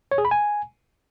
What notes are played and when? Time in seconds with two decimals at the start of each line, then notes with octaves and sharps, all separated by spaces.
0.11 C#5
0.18 G#4
0.25 B5
0.31 G#5